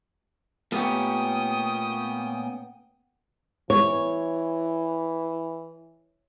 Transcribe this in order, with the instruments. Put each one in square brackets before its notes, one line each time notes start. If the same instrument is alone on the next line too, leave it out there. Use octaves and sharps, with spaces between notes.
[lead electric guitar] A#2 C#4 [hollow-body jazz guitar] A3 B3 G4 [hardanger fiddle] G5 D#6
[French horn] E3 [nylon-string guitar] C#5